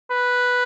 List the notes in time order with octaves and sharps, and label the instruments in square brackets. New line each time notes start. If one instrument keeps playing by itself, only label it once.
[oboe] B4